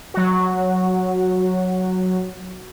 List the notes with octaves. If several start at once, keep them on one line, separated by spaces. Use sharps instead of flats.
F#3 F#4